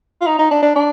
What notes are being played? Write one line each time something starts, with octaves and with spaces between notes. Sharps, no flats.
F4
D#4
D#4
D4
D4
D4